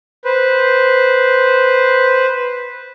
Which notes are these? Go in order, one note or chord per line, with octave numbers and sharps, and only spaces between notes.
B4 C5